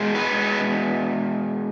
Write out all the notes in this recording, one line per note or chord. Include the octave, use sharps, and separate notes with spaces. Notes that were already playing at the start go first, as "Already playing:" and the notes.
Already playing: B2 G#3
B4